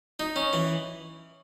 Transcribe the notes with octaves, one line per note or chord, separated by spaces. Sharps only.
D#4
C#4
E3